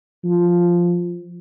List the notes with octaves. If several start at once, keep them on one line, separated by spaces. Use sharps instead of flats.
F3